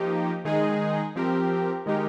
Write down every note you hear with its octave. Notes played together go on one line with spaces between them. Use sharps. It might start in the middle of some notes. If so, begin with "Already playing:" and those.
Already playing: F3 A#3 D#4 G4
D#3 G#3 D#4 G#4
F3 C4 G4 A#4
D#3 G#3 D#4 G4 A#4